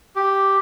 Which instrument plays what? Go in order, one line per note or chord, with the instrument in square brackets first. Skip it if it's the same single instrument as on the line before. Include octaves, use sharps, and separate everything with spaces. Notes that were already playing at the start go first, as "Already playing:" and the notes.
[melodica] G4